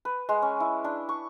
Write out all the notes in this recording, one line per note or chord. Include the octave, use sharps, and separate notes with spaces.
B4
G#3
C#4
E4
D4
C#6